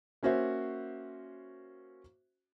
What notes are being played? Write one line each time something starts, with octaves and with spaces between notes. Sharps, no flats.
A#3 C#4 F#4 C5 E5